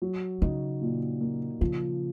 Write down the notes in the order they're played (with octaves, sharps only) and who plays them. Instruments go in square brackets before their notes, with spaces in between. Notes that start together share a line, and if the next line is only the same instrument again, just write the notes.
[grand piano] F#3
[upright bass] C#3 [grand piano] D#4
[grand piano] A#2
A#3
[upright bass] C#3 [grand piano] F3